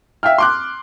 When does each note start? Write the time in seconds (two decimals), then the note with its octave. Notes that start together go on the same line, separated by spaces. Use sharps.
0.23 E5 F5 G5 F6
0.38 C6 D6 F#6